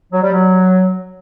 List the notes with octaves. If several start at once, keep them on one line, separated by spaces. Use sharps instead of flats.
F#3
G3
F#3